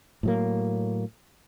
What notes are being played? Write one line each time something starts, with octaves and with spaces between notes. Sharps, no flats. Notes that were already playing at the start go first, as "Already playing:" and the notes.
A2 F#3 A#3